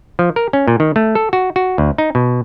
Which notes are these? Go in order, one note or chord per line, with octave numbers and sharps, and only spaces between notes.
F3
A#4
C#4
A#2
D#3
A3
A4
F#4
F#4
D2
D#4
B2